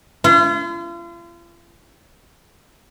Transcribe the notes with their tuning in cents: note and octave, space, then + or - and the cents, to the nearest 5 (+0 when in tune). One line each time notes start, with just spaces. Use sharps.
F4 -40